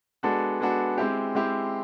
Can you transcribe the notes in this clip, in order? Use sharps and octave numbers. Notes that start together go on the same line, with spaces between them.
G#3 B3 D4 F#4 A4
G#3 B3 D4 F#4 A4
G#3 C4 E4 G4
G#3 C4 E4 G4